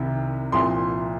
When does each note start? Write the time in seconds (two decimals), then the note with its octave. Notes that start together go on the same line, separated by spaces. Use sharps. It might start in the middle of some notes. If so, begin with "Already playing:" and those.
Already playing: C2 C3 D#3
0.52 C2 A#2 F3 C6